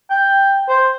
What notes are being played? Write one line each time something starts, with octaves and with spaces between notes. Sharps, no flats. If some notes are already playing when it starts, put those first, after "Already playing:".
G5
C5